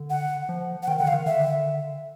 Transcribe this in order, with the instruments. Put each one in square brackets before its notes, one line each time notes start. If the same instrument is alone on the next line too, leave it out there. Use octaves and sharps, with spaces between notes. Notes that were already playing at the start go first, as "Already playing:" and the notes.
Already playing: [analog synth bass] D3
[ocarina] F#5
[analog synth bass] F3
[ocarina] F#5
[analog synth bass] D#3 [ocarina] G5
[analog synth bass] D3 [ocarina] F#5
[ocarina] F5
[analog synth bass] D#3
[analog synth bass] D3 [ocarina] E5